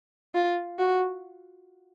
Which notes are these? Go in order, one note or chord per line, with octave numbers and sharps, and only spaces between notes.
F4
F#4